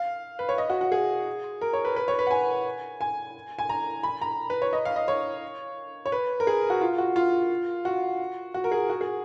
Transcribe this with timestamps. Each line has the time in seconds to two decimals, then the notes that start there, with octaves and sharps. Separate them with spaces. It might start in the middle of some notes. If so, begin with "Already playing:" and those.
Already playing: F5
0.39 B4
0.49 C#5
0.58 D#5
0.70 F#4
0.81 F#4
0.92 G#4
1.61 A#4
1.73 C#5
1.85 B4
1.96 B4
2.08 C#5
2.19 B4
2.27 F#5
2.31 G#5
3.01 G#5
3.59 G#5
3.69 A#5
4.03 B5
4.22 A#5
4.50 B4
4.62 C#5
4.73 D#5
4.85 F5
4.96 D#5
5.08 C#5
6.06 C#5
6.12 B4
6.40 A#4
6.47 G#4
6.70 F#4
6.81 F4
6.98 F#4
7.16 F4
7.85 F#4
8.54 F#4
8.64 A#4
8.72 G#4
8.90 F#4
9.01 G#4